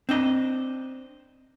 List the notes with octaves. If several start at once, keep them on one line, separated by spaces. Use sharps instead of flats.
C4 D4 D#5